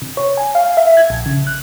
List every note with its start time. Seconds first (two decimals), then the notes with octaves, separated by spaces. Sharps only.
0.02 C3
0.17 C#5
0.37 G#5
0.55 F5
0.77 E5
0.97 G#6
1.10 A#1
1.26 C#3
1.47 F#6